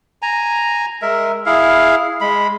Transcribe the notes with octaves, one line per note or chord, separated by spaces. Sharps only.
G#5 A#5
G#3 A#4 E5
E4 G#4 F5
G#3 B5